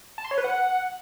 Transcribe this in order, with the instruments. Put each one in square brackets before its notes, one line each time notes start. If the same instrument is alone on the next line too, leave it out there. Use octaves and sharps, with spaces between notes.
[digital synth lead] A5
C6
C#5
B4
F#5